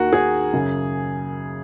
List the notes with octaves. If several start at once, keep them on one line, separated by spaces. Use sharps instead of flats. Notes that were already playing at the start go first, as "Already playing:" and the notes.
Already playing: D#2 D#3 F#4 A#4
G#4
F#2 C#3